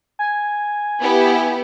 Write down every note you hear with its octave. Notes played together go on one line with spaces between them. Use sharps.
G#5
B3 E4 G4